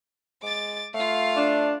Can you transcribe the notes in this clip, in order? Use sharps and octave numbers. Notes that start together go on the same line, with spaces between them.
G#3 D6 A6
A3 F4 F5
D4